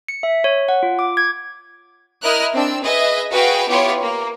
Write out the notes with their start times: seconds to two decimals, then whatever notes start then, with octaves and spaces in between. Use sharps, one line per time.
0.08 C#7
0.23 E5
0.44 C#5
0.69 F#5
0.83 F4
0.99 D6
1.17 G#6
2.22 E4 A#4 D#5 F6 F#6
2.54 C4 D4 E6
2.84 G#4 B4 D#5 E5
3.33 F#4 G#4 B4 F5 G5
3.69 B3 E4 F4 G4 C#5
4.02 A#3